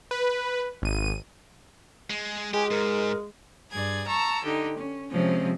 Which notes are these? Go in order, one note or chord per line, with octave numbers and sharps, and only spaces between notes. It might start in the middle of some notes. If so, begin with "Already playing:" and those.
B4
G#1 D#7
G#3
G#3 G4 G#5
G#2 A#4
G2 G#4 D5 G#6
A5 A#5 C#6 E6
D3 D#4 G4
C#4
C3 F3 G#3 C4 C#4